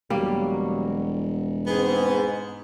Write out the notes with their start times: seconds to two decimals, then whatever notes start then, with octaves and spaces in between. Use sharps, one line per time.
0.10 E1 F#3 G3 A#3
1.67 G#2 B3 C4 G#4